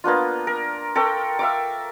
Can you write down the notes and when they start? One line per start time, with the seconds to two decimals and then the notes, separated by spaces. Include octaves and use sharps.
0.04 A#3 B3 D4 F4
0.47 A#4
0.95 A4 A#4 G5 C#6
1.39 E5 F5 D6